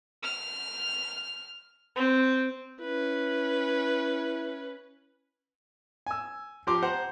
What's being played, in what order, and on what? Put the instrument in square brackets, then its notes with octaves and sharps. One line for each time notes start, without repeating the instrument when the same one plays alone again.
[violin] F6
C4
[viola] C#4 B4 [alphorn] E4
[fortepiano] G#5 E6
F3 G4 A#5 C6 D6
C5 F#5 A#5